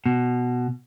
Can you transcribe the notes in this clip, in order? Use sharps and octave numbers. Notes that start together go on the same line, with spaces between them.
B2